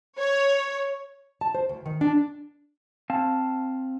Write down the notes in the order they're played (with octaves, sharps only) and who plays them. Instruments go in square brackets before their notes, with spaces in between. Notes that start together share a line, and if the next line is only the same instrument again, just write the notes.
[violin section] C#5
[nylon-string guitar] A5
C5
D2
D#3
D4
[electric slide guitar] C4 F5 A5